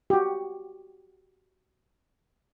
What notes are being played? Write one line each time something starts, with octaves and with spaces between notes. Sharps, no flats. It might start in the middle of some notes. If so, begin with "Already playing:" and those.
F#4 G4